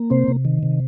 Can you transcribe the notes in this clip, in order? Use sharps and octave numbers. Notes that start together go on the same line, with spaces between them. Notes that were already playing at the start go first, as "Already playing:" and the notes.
Already playing: A#3
C3 C4 C5
C3
D#3
C3